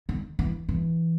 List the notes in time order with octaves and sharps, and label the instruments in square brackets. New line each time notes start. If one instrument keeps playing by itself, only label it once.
[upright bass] D#3
E3
E3